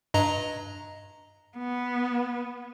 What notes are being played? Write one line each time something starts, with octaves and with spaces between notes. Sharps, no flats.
G2 D#5 A#5
B3